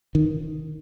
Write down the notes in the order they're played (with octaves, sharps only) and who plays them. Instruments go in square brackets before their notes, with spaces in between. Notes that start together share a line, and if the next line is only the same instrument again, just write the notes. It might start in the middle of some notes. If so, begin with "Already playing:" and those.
[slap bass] D#3